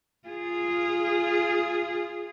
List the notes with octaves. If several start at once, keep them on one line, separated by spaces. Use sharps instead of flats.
F4 G#4